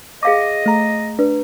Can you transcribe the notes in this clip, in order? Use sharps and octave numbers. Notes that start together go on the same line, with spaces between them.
G#4 D#5 F5 D6
A3 A#5
D4 B4